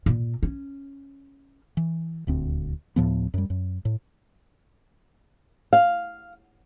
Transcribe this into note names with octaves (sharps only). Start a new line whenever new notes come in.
A#2
C#4
E3
D#1 D2 C4
D2 A2 F3 B3
F#2 G3
F#2
A2
F5